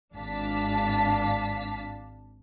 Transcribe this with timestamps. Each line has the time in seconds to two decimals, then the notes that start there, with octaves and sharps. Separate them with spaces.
0.14 G#1 D4 F5 A5 B6